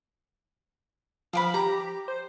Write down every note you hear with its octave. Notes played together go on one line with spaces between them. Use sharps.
F3 F5 G5 B5
G4 A#5
C5